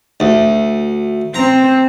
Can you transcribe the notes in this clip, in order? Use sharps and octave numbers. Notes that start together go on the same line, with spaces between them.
D2
C4 A#5